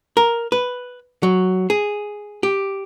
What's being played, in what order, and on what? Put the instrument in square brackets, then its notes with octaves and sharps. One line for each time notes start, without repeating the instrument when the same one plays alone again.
[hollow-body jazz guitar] A#4
B4
F#3
G#4
G4